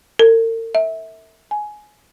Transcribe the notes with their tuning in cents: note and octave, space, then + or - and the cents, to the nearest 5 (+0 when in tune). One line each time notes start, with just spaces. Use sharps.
A#4 -45
E5 -25
G#5 +15